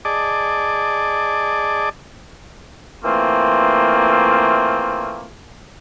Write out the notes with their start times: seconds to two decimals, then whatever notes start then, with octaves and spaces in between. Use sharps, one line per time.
0.05 G#4 D5 D#5 A5 D6
3.05 E3 A3 A#3 C4 F4